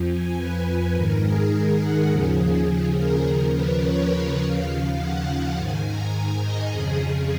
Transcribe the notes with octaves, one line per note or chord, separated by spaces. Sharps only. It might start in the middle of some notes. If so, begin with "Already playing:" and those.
Already playing: F2 F3
G#5
B4
G#2 D#3 A#4
G#4
A#4
F#5
D#2 C#3 F3 G#4
G#4
A#4
D#2 C#3 F3 A#4
B4
C#5
D#2 C#3 F3 F5
F#5
G#2 D#3 G#5
A#5
G#5
D#5
F2 C#3 F3 G#4